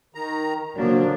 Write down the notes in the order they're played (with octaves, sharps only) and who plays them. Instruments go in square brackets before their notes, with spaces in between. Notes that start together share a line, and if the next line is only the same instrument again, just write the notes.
[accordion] D#3 A#5
[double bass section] D3 A#3 [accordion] F3 [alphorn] F#3 [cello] D4